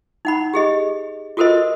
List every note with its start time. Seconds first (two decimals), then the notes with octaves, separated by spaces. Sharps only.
0.25 D#4 F#5 B5
0.54 G4 G#4 D#5
1.37 F4 F#4 A4 A#4 C5 D#5